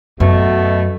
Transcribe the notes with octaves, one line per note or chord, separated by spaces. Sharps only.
F#2 B2 A3